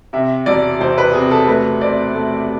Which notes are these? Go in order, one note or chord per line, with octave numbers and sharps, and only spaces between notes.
C3 E5
E1 D5
E1 C5
B4
C3 G#4
A4
A3 B4
C4 D5
A3